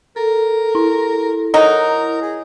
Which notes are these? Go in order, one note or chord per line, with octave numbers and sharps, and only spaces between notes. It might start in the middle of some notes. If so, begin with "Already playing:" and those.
A4 A#4
E4
F#3 D#4 A#4
G#4